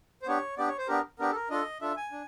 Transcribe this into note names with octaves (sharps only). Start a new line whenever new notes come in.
C5
B3 D4 G4 C#5
B3 D4 G4 D5
C#5
C5
B3 D4 G4 A#4
B3 D4 G4 A#4
A4
A#4
D4 F4 A4 D#5
D4 F4 A4 E5
G#5
D4